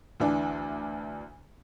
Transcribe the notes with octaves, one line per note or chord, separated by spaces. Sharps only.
D2 E3 D4